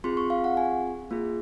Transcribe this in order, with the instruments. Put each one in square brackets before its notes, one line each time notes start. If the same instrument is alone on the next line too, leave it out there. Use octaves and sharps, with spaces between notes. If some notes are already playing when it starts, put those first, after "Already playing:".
[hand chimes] C4 F4 G#4 C6
C#6
F5
F#5
G#5
A#3 F4 G#4